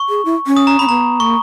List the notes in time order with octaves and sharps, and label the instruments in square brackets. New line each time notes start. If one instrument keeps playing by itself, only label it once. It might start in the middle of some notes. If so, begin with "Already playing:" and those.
Already playing: [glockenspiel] C#6
[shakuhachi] G#4
E4
C#4
[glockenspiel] D#6
A#5
[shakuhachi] C#4 [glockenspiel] B5
[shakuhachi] B3 [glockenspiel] A#5
[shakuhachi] A#3 [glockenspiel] C#6